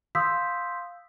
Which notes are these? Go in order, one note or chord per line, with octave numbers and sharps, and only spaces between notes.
F5 C6 D#6 E6 G6 B6